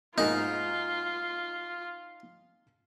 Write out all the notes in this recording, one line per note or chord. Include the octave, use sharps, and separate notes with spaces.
G#2 B2 A#3 D#4 F4